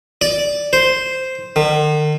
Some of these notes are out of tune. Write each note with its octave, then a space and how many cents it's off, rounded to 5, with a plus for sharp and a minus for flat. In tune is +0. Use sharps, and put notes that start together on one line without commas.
D5 -5
C5 -5
D#3 -45